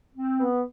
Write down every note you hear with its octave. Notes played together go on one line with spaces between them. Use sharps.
C4
B3